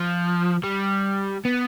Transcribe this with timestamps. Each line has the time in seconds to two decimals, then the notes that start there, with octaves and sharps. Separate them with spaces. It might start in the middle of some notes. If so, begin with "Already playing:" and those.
Already playing: F3
0.64 G3
1.45 B3